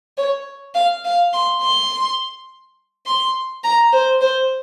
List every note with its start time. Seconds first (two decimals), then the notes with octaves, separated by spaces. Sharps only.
0.17 C#5
0.75 F5
1.05 F5
1.33 C6
1.62 C6
3.06 C6
3.63 A#5
3.92 C5
4.21 C5